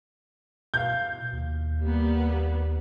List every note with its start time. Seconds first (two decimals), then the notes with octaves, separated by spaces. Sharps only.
0.74 B2 F5 G6
1.33 D#2
1.80 G3 A#3 B3